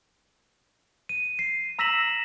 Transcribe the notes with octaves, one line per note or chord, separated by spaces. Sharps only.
D#7
C7
A#5 E6 A#6 B6 E7 F#7